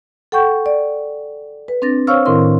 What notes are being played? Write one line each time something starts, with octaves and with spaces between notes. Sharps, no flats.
A4 F#5 G5 C#6 G6
D5
B4
C4 D4 A6 A#6
C5 C#5 F5 C#6 E6 F6
A2 D#3 C4 E4 A#4 C6